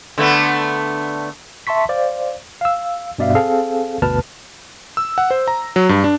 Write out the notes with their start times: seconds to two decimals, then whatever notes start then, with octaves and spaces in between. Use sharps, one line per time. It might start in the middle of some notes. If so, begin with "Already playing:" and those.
0.18 D3 A3 B3
1.67 E5 A5 C6 C#6 B6
1.89 C5 D5 F5
2.61 F5 E6
3.19 G2 B2 D5 E5 F5
3.35 C4 G#4 A4 F5
4.02 G1 D2 B2 B4 A5 F6
4.97 E6
5.18 F#5
5.31 C5
5.48 A#5
5.76 F#3
5.89 G2
6.04 D4